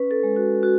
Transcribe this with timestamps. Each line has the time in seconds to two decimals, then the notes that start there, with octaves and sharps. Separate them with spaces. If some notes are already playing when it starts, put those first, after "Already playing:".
Already playing: C#4 B4
0.11 A4
0.23 G#3
0.36 F#4
0.63 F#4